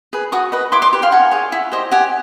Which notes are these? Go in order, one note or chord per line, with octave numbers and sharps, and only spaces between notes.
G#4 B4
F#4 C#6 D#6
B4 D#5
E4 C6 D6
C6 D6
G4 B4
F5 G5
D#4 F#5 G#5
G#4 C#5
E4
G4 C5 D#5
G4 F#5 G#5